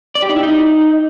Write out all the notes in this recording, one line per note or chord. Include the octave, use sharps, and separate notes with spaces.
D5
G4
D#4
E4
D#4